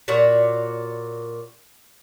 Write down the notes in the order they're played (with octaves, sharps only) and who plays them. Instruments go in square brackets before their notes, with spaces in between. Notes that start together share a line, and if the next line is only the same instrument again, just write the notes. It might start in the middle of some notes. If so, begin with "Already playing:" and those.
[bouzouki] A#2 F#4 C#5 D5